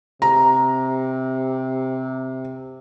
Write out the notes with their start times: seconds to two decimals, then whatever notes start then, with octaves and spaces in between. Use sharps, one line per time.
0.22 C3 A#5